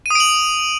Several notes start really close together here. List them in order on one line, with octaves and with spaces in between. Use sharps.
D#7 D#6 D7 F#7